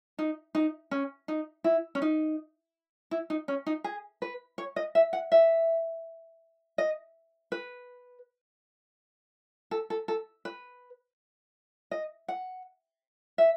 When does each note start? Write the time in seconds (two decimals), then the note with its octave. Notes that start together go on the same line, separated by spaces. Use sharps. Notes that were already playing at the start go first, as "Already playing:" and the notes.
0.19 D#4
0.55 D#4
0.91 C#4
1.28 D#4
1.64 E4
1.95 C#4
2.02 D#4
3.11 E4
3.30 D#4
3.48 C#4
3.66 D#4
3.84 G#4
4.22 B4
4.58 C#5
4.76 D#5
4.95 E5
5.13 F#5
5.32 E5
6.78 D#5
7.52 B4
9.71 A4
9.90 A4
10.08 A4
10.45 B4
11.91 D#5
12.28 F#5
13.38 E5